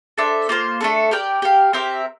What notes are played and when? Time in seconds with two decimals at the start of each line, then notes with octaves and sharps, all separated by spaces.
0.18 D4 A4 C5 E5
0.49 A#3 F4 C5
0.81 A3 D4 A4
1.11 G4 A#4 D5 G5
1.42 G4 A#4 F5
1.73 C4 G4 A#4 E5